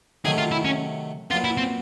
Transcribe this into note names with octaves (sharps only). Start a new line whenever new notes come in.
C3 D#3 F#3 A3 G#4
F4
E4
C#4
A#2 F#3 B3 F4
E4
C4